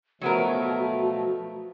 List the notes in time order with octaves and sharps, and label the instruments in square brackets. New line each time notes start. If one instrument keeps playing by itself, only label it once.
[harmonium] B2 F3 A3 [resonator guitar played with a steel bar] F#3 B3 A#4 [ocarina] F#4